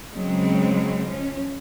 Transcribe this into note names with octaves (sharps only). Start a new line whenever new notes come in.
C#3 F#3 G#3 C4
F3 C#4